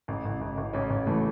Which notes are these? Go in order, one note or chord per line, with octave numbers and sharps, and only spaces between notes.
A1
A1
A1
A1
A1 C#4
A1
E3 A3